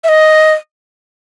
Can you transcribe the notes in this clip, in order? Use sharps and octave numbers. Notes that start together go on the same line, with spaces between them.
E5
D#5